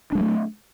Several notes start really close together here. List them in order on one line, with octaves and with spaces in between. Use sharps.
D4 G#3 F#3 A3